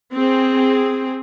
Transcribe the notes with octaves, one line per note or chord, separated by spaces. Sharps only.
C4 G#4